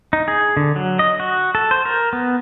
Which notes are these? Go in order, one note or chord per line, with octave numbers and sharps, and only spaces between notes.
D#4
G#4
D3
F#3
D#5
F#4
A4
C5
A#4
B3